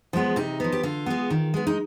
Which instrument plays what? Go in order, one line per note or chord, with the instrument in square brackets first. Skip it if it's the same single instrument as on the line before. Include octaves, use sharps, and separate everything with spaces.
[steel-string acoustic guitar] F3 G#3 B3
C3 D#4
F3 B3
G4
D3 F4
G#3 B3
D#3
G#3 B3
D#4